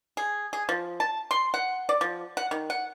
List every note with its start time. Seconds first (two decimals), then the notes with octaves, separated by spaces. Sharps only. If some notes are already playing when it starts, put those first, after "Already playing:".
0.17 G#4
0.53 G#4
0.69 F3
1.00 A5
1.31 C6
1.54 F#5
1.89 D5
2.01 F3
2.37 F#5
2.51 D#3
2.70 F#5